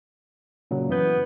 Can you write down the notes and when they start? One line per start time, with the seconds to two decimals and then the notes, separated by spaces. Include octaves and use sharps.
0.71 A#2 C#3 F#3
0.89 F#2 E3 B3 G6